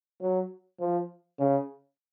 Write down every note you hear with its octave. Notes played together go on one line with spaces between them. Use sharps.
F#3
F3
C#3